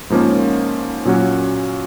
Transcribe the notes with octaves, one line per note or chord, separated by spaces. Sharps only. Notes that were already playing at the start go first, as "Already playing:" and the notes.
G#2 F3 A#3 C#4
A#2 F#3 C#4 F#4